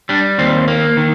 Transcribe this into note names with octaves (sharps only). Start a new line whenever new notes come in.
G3 D4
D#2 C4
A#3
D#3